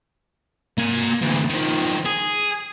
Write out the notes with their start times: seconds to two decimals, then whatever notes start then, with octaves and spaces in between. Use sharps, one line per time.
0.78 A#3 G#5
1.22 D2 E3
1.49 D#3 F3
2.05 G#4